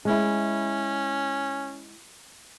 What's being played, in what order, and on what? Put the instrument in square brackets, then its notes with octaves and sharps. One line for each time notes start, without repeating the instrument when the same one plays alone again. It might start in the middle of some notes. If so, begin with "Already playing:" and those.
[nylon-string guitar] G#3 E4 [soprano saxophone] C#4